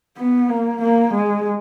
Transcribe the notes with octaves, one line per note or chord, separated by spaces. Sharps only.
B3
A#3
A#3
G#3